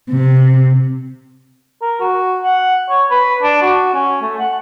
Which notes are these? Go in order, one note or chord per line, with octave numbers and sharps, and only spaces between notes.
C3
A#4
F#4
F#5
C#5
B4
D4
F#4
C#4
A3
F#5